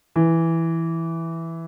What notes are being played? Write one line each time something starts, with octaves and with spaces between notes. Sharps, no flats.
E3